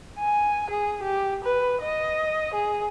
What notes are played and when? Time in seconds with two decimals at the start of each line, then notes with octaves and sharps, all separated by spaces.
0.19 G#5
0.69 G#4
1.02 G4
1.44 B4
1.81 D#5
2.54 G#4